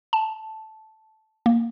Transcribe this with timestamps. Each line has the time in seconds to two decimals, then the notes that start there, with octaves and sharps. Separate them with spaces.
0.13 A5
1.46 A#3